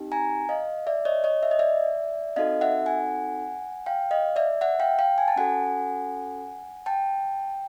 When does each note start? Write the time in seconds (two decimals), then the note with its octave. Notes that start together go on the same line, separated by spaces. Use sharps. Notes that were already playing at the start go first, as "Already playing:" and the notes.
Already playing: C4 D#4 G4
0.12 G#5 A#5
0.49 D#5 F5
0.87 D5 E5
1.05 C#5 D#5
1.24 C#5 D#5
1.43 E5
1.51 D#5
1.59 D5 E5
2.36 C4 D#4 F#4 A4 D#5 F5
2.61 E5 F#5
2.86 F#5 G#5
3.86 F5 G5
4.11 D#5 F5
4.36 D5 E5
4.61 E5 F#5
4.80 F5 G5
4.99 F5 G5
5.18 G#5
5.28 A5
5.36 C#4 F#4 A4 F#5 G#5
6.86 G5 A5